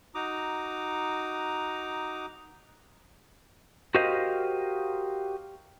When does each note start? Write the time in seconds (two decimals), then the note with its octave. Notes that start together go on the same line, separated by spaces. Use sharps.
0.15 D#4 F#4 A#5 D6 D#6
3.95 F#4 G4 A#4 C5 D#5 F5